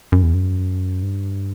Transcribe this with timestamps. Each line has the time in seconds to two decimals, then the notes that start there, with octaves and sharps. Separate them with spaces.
0.12 F#2
0.23 E2
0.34 F#2
1.03 G2